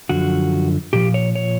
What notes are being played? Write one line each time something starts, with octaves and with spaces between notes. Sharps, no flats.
F#2 D3 F3 F#4
A#2 F3 G4
C#5
C#5